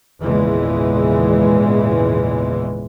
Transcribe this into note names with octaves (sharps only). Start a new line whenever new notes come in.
G#1 E2 A#2 C#3 E3 G#3